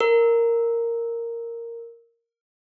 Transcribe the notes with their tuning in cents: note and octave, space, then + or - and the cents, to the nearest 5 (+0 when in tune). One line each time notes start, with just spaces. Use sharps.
A#4 -5